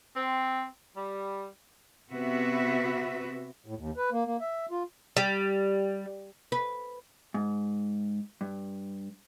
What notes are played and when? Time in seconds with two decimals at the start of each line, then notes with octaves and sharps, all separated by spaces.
0.16 C4
0.97 G3
2.11 C3 B3 F#4 B4 E5
3.66 A2
3.77 D#2
3.97 B4
4.12 A#3
4.25 A#3
4.41 E5
4.71 F4
5.17 G3
6.52 B4
7.34 G#2
8.41 G2